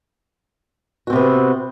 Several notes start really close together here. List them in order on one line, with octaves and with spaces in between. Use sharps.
F#4 C4 C3 B3